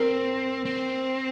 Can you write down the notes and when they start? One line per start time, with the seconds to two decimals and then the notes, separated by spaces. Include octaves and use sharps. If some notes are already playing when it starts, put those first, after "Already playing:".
Already playing: C4 A#4
0.65 C4